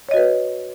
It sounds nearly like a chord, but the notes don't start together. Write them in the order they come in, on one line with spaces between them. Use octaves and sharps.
C#5 D#5 F#4 B4